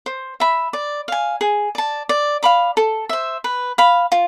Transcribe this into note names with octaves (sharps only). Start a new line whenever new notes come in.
C5
E5 B5
D5
F5 G#5
G#4
D5 A5
D5
F5 B5 D6
A4
C5 E5
B4
F5 B5
F4